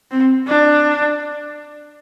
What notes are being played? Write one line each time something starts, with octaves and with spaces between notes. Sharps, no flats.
C4
D4